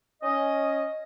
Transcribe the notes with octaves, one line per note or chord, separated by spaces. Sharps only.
C#4 D#5